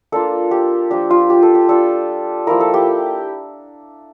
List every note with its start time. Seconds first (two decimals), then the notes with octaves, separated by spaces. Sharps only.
0.12 A#3 D4 F4 A4
0.51 G4
0.90 F3 A#3 D4 G4
1.10 F4
1.30 G4
1.42 A4
1.55 G4
1.69 G3 D4 F4 A4
2.47 F3 A#3 E4 A#4
2.61 A4
2.74 G4